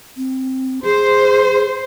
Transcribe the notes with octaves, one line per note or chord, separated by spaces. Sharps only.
C4
G#4 C5